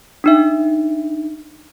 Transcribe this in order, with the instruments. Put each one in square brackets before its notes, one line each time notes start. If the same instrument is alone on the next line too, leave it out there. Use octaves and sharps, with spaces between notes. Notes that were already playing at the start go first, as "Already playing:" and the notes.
[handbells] D4 D#4 E5